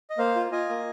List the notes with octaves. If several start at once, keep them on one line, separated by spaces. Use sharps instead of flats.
D#5
A#3 C5 F5
F4
F4 D#5 G#5
A#3